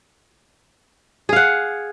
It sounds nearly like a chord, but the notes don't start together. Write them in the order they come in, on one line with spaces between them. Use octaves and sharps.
G#4 F5 F#5